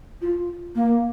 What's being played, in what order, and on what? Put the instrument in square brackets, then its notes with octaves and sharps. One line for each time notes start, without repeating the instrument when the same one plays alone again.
[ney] F4
A#3